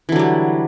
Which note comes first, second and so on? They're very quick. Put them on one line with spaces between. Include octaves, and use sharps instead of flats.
E3 D3 F#3 G3